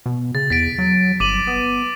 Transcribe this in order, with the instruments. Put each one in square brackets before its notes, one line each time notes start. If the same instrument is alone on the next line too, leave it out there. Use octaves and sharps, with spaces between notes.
[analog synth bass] B2
[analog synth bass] C#3 [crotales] A6
[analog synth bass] E2 [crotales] A6 B6 D7
[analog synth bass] F#3
[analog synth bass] G1 [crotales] D6 D#7 F#7
[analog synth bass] B3